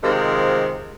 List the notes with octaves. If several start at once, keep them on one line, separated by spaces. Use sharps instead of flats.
C3 D#3 F3 G#3